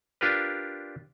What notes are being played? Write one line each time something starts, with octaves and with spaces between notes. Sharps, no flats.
D4 F4 G4 A#4 B4